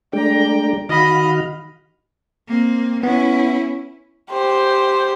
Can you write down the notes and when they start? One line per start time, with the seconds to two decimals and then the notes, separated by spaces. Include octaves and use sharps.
0.13 G#3 A3 D4 G5 A#5
0.89 D#3 F#4 D#5 F5 B5
2.47 A#3 C4
3.03 B3 C#4 E4
4.31 G4 C5